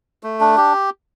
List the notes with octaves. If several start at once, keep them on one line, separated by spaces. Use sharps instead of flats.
A3
D4
G4